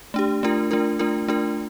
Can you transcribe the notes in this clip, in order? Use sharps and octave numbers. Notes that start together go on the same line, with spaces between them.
A3 D4 G4
A3 D4 F4 A#4
A3 D4 F4 A#4
A3 D4 F4 A#4
A3 D4 F4 A#4